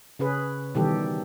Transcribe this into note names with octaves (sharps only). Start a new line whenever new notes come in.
C#3 C#4 G#4 B4
B2 D#3 E3 G3 G4 A4